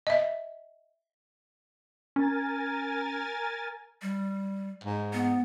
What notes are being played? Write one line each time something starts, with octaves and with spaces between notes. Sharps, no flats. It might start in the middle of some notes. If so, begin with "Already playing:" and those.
D#5 E5
C#4 A#4 G#5 A6
G3
G#2
B3